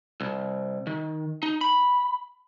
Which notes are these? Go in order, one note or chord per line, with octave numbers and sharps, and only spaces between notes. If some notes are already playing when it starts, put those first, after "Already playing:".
C2
D#3
D#4
B5